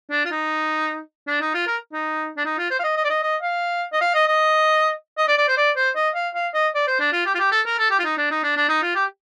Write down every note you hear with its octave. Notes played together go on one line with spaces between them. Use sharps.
D4
F4
D#4
D4
D#4
F4
A#4
D#4
D4
D#4
F4
C5
F5
D#5
D#5
D5
D#5
D#5
F5
D#5
F5
D#5
D#5
D#5
D5
D5
C5
D5
C5
D#5
F5
F5
D#5
D5
C5
D4
F4
G4
F4
G4
A4
A#4
A4
G4
F4
D#4
D4
D#4
D4
D4
D#4
F4
G4